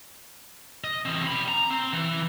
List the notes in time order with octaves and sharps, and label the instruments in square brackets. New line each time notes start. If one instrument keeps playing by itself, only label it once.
[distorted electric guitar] D#5
E3 C4
G5 B5
A#5
C4
E3